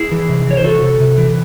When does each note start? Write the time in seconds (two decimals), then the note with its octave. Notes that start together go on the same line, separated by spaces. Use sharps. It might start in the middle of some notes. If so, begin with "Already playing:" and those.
Already playing: E4 G#4
0.11 E3
0.29 C3
0.47 E3 C#5
0.57 C5
0.64 C3 F#4 A4
0.82 C3
1.00 C3
1.18 E3